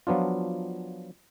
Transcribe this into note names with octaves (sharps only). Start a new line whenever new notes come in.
F3 F#3 B3 D4 F4